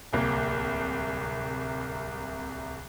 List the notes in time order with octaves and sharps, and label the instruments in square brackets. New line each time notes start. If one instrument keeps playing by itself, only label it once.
[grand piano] D1 C2 A#3